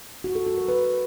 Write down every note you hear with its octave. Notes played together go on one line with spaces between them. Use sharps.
F#4
A4
F#4
A#4
B4